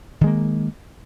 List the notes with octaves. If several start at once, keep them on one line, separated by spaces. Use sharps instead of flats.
D#3 G#3 A#3